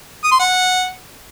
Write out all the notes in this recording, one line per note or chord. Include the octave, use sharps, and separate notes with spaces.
D#6
C6
F#5